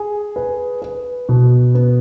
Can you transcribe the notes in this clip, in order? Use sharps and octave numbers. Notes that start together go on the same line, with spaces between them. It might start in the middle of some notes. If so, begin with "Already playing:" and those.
Already playing: G#4
B4
B4
B2
B3